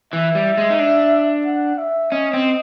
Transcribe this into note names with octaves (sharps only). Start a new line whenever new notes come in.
E3 E5
G3
G#3
D#4
D4
F#5
E5
C#4 D#5
C4